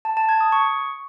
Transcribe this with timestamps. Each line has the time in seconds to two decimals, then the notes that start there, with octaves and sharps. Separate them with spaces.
0.05 A5
0.17 A5
0.29 G#6
0.41 D#6
0.52 C#6